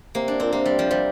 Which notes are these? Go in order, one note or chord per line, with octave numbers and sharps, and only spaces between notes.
C3 A#3
D4
A#2 C4
C3 A#3
G3
F3
C3 G3